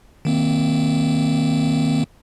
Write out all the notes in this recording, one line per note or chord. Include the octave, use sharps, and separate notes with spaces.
D#3 A#3 C4